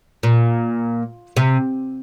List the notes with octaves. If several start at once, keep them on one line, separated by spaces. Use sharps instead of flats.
A#2
C3